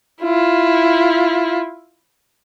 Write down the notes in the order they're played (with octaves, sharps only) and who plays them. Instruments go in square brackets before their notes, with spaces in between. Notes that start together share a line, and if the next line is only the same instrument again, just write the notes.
[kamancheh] E4 F4